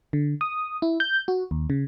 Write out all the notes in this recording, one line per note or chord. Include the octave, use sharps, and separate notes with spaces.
D3
D#6
E4
G6
F#4
D#2
C#3